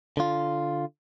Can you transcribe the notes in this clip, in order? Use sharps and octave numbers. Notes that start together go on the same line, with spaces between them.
D3 F4